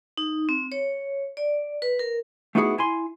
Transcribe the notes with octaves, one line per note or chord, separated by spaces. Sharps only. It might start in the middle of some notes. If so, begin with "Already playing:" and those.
D#4
C4
C#5
D5
B4
A#4
A3 B3 D#4 E4 F#4 G#4
E4 G#5 C6